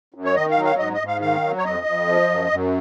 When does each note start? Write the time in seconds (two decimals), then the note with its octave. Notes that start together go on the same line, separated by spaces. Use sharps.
0.14 F#2
0.25 C#5
0.35 D#3 D#5
0.51 F5
0.57 F#3
0.65 F5
0.78 G#2 D#5
0.93 D#5
1.00 G#2
1.07 F5
1.21 D#3 F5
1.44 F#3
1.58 C#5
1.65 F2 D#5
1.86 F2
2.07 F3
2.29 F#2
2.50 F#2